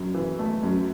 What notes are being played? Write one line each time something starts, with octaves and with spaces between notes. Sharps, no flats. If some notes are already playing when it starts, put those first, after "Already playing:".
Already playing: F#2
E3
A3
F#2